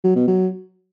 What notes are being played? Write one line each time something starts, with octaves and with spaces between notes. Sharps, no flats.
F#3
B2
F#3